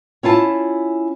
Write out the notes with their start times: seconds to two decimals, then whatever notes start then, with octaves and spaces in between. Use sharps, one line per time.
0.23 C#4 E4 F4 A5